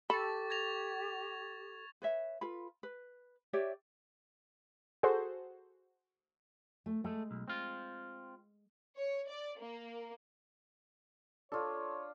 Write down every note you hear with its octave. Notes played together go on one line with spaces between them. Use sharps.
G4 A4 B5 C#6 A6
G#6 A#6 F7
B4 C#5 E5
F4 A4 B4 B5
B4
G4 C#5 D5 E5
F#4 G#4 A4 C5
A3
G#3 A3
B1
C4 F4
C#5
D5
A#3
D4 F4 A4 C#5